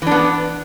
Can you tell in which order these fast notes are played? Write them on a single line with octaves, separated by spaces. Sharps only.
E3 D4 B3